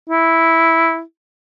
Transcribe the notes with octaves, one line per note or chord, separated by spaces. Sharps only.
E4